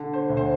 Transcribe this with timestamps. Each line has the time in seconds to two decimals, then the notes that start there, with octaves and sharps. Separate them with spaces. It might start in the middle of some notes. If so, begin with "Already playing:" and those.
Already playing: D3
0.13 C5
0.29 D2
0.37 C5